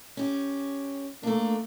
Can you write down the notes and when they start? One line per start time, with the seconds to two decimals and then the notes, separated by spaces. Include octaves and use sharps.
0.17 C#4 G4
1.23 A3 A#3 D4